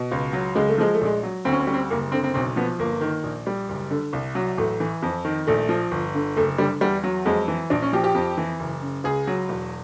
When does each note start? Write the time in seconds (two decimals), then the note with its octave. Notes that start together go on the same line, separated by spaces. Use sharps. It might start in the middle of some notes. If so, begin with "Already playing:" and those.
Already playing: B2
0.12 C#2
0.33 F#3
0.55 C#2 G#3
0.68 A3
0.78 F3 G#3
0.94 A3
1.01 A#1 G#3
1.23 F#3
1.45 D2 C4
1.52 C#4
1.60 C4
1.67 G3 C#4
1.74 C4
1.90 F#1 A#3
2.12 D3 C4
2.24 C4
2.34 B1 C4
2.56 F3 B3
2.79 G1 A#3
3.01 D#3
3.24 A#1
3.47 G3
3.69 F#1
3.91 D3
4.13 C2
4.35 F#3
4.58 A1 A3
4.80 E3
5.02 F2
5.25 D#3
5.47 A#1 A3
5.69 F3
5.91 G1
6.15 D3
6.36 F#1 A3
6.58 D3 G3
6.81 E2 G3
7.04 F#3
7.25 F2 G#3
7.48 E3
7.70 A#1 D4
7.82 C#4
7.93 F3 G4
8.04 G4
8.15 F2
8.37 E3
8.59 F#1
8.82 C#3
9.04 C#2 G#4
9.27 F#3
9.49 E1